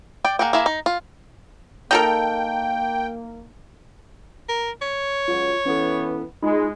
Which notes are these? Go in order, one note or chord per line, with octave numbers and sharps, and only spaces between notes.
D5 G5
A#3 G#4 F#5 G5
A#3 E4 G#4 E5
D#4
F4
A#3 D#4 A4 A#4 G5
A#4
C#5
C#2 F#3 F4
E3 B3 C#4 A4
G#3 D#4 F4 B5